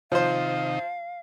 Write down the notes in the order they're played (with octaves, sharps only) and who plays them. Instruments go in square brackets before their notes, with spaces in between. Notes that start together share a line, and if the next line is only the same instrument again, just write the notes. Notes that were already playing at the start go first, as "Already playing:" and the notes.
[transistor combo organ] C3 D#3 D#4 [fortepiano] F3 C5 [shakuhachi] F5